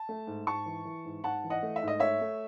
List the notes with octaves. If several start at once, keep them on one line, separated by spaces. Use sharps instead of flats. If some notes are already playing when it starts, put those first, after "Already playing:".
Already playing: A5
A3
G#2
G#2 A5 C#6
E3
E3
G#2
G#2 F#5 A5
E3
D#5 F#5
A3
E5
G#2
D#5
A3 C#5 E5
A3